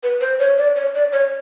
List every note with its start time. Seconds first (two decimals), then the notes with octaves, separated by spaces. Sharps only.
0.03 B4
0.21 C5
0.39 C#5
0.58 D5
0.76 C#5
0.95 D5
1.13 C#5